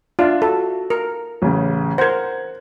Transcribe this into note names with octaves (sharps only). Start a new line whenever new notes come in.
D4 F4 D5 E5
F#4 A4
A#4
A1 C#3
A#4 C5 F#5 G#6